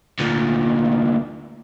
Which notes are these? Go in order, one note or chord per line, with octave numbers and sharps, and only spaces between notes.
D2 A#2